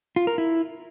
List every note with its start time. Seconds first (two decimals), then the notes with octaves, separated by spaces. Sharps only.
0.16 F4
0.27 A#4
0.38 E4